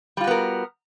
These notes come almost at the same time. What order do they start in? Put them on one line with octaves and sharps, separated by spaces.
G3 F4 F#4 B3 A#4